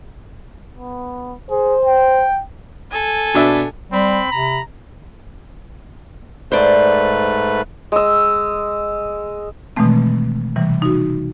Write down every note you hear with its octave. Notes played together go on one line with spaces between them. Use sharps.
B3
G#4 C5
G5
A4 G#5
B2 D4 E5
G3 C4 B5
C3 A#5
G#2 A3 B4 C5 D5
G#3 E6
B2 D#3 E3 G#3 A3 C4
C3 E3 G3
D#4 F#4